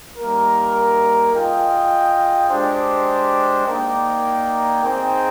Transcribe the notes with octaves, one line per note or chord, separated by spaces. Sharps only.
G3 A#3 D#4 A#4
F4 G#4 D#5 G5
G#3 D4 G4 C5
A#3 D#4 A#4 D5 G5
C4 D#4 G#4 C5 G5